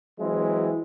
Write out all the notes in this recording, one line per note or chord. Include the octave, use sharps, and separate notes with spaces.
E3 F#3 G#3 C4 E4